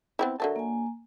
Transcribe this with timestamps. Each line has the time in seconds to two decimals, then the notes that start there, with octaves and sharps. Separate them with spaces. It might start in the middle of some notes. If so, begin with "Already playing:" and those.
0.19 B3 C4 E4
0.40 D3 F#3 A4 A#4 E5 A5
0.56 A#3 G#5